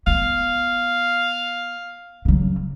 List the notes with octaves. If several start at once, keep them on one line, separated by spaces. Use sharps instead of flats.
B3 F5
C#3 F#3